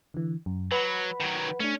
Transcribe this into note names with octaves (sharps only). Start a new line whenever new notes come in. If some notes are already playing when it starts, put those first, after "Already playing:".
D3 E3
F#2
F#3 B4 F#5 B5
D#3 F#3
A3 C#4 D4